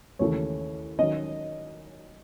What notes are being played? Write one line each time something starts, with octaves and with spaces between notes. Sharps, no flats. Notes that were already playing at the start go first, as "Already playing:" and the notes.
D#2 C#3 E3 A3 C#5
D#3 F#3 C#4 D#5